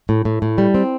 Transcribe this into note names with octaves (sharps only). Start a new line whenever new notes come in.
A2
A2
A2
G3
C4